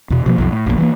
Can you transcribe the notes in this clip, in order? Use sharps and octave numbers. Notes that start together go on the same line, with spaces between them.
E2 B2
B2 F3 A#3
B1 F2
A2
A#1 F2 E3 A#3
E3 F#3 A#3